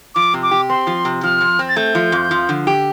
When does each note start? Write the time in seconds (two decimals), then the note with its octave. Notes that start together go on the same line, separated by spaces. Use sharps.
0.15 F3 D6
0.34 C3
0.43 D6
0.51 G4
0.69 C4 C6
0.87 F3
1.05 C3
1.23 F3 F6
1.41 F2
1.59 C4
1.69 A6
1.76 A3 G6
1.95 F3
2.12 F2
2.31 F3
2.49 D3
2.67 G4